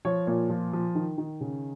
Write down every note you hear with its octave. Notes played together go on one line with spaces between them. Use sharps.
F3 C#5
A#2 C#5
F3
F3
D#3
D#3
C#3